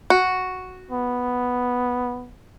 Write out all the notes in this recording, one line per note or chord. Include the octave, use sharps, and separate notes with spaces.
F#4
B3